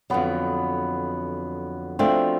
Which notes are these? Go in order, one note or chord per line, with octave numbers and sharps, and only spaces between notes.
F2 D3 F#3 B3
F3 A3 C4 D4 F#4